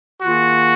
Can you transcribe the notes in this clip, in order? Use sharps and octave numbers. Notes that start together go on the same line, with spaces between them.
D#3 A#3 F4 F#4 G#4